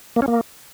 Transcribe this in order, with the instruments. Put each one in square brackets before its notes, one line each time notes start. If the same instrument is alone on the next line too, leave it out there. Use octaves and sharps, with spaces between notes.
[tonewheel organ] A#3
C#4
A#3